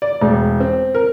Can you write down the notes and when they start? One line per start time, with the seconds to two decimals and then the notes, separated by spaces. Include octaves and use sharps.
0.02 D5
0.21 E1
0.60 C4
0.95 A#4